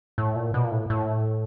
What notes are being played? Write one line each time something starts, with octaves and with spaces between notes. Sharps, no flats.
A2
A#2
B2
A#2
A2
A2